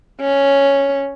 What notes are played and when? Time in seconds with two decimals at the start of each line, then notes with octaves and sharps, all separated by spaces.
0.21 C#4